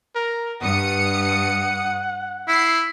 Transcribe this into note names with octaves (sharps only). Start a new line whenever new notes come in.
A#4
G2 F#5 D#6 C#7
E4 C7